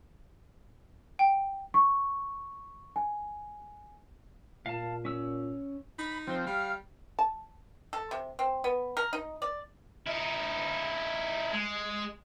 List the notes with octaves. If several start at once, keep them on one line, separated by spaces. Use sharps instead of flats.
G5
C#6
G#5
A#2 F5 A5
C#4 E6
D#4 B5
F3 C4
G3 F5
A5
A4
C3
C4
B3
A#4
D#4
D5
D#4 E4
G#3